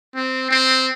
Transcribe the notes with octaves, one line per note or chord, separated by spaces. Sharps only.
C4
C4